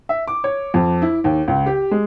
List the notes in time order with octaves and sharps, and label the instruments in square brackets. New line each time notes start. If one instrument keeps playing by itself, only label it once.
[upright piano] E5
D6
C#5
F2
E4
D#2
C#2
G4
G#3